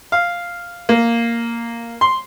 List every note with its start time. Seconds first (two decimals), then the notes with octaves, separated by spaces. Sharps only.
0.12 F5
0.89 A#3
2.01 C6